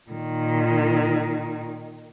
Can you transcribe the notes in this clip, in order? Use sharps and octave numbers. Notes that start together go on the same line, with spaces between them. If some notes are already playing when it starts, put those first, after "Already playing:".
A#2 D#3